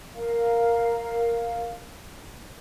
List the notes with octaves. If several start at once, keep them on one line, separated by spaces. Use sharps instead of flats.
A#4 F5